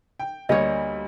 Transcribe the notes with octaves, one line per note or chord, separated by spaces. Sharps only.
G5
D2 G3 A#3 C#5 D#5